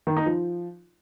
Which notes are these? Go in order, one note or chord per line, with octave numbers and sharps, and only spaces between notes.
D#3
D#4
F3